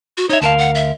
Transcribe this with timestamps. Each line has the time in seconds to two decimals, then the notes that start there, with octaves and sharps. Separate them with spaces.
0.17 F#4
0.29 D#4 C#5 E5
0.42 D2 A#4 F5 A5
0.58 F#5
0.75 E5